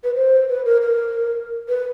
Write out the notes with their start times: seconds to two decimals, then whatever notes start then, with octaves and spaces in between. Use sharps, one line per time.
0.04 B4
0.15 C5
0.49 B4
0.65 A#4
0.82 A#4
1.69 B4